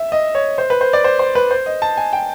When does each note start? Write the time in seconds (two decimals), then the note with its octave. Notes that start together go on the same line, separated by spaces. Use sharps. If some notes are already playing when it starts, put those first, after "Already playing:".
Already playing: E5
0.12 D#5
0.35 C#5
0.58 C5
0.70 B4
0.81 C5
0.93 D5
1.04 C5
1.19 C5
1.35 B4
1.51 C5
1.66 D#5
1.82 A5
1.97 G#5
2.13 G5